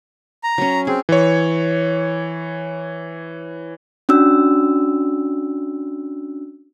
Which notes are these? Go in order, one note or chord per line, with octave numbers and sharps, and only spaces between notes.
A#5
F#3 C#4
C4 G#4
E3 C#5
C#4 D4 F#4 E6